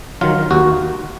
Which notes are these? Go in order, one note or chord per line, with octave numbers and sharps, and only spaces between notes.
D#3 F#3 F4
D#2 F#4